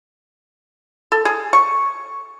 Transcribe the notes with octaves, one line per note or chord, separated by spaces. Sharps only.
A4
G#4
C#6